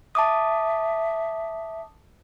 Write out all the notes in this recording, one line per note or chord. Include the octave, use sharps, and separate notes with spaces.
E5 A5 D6 D#6